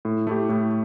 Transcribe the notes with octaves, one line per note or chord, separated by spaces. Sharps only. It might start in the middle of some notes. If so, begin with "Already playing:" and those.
A2
A3 E4 G4
A2